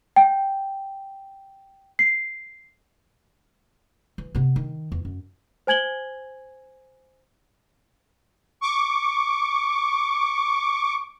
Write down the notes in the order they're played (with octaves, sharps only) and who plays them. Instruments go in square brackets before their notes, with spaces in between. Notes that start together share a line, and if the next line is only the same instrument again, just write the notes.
[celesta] G5
C7
[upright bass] E3
C3 B3
D#3
E2
F#2
[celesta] C5 G#5 G#6 F#7 G7
[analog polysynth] C#6 D6